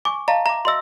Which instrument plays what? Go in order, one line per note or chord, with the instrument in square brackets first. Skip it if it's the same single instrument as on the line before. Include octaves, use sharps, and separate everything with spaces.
[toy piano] G#5 C#6 [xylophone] D6
[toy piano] D#5 F5 A5 [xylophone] A#5
[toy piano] E5 D6 [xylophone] A#5
[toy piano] F#4 D#5 E5 [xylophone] C6 E6